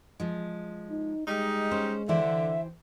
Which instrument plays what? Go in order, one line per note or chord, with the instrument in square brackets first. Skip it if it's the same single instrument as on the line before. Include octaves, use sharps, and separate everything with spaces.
[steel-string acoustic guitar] F3 G#3
[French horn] D#4
[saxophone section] G3 D#4 [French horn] G#3
[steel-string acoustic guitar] C#4 C5
[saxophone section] D3 [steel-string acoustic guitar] E3 G4 C5 [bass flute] E5